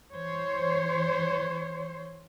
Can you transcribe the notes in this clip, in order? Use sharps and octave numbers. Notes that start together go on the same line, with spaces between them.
E3 C5 C#5